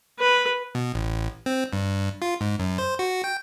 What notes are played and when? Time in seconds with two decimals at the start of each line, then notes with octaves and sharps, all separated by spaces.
0.20 B4
0.75 B2
0.94 A1
1.46 C4
1.73 G2
2.22 F4
2.41 G#2
2.59 F#2
2.78 C5
2.99 F#4
3.24 G5